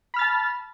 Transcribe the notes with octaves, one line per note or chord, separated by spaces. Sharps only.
A5 B5 F6 A6